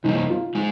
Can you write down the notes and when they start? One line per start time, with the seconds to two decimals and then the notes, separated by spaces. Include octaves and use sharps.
0.04 C3 G3 A#3 D#4
0.30 F4
0.55 G#3 D#4